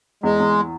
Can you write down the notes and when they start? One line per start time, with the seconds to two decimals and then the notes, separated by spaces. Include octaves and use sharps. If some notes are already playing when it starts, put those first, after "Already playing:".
0.23 E2 G#3
0.40 E2